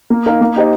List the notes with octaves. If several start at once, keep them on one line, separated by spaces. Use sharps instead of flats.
A#3
D#4 A#4 F5
A#3
D#4 G4 C5 D#5